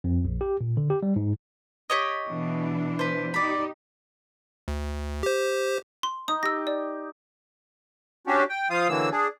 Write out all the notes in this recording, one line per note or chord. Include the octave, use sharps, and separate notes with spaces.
F2
A#1
G4
A#2
D3
G4
G3
G#2
G4 C#5 D#5
B2 E3 D4
B4 C5
D#4 G4 D5 B5
D2
G4 C5
C6
D#4 D#6
G4 E6 A#6
D5
C#4 D4 F#4 G4
G5
F3 F4 F5 D#6
D3 E3 F#3 A#3 E6
D4 G#4